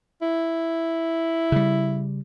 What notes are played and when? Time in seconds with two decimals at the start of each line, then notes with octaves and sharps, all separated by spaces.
0.22 E4
1.52 C#3 G3